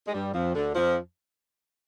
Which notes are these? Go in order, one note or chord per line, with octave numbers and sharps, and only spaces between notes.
G#3
G2 G3
F2 F3
D2 D3
F2 F3